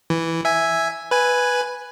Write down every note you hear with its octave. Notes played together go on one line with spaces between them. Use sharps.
E3
E5 G#5
B4 G#5